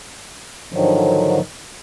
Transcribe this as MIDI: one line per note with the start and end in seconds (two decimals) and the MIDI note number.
0.73 1.40 44
0.73 1.40 50
0.73 1.40 51
0.73 1.40 53
0.73 1.40 54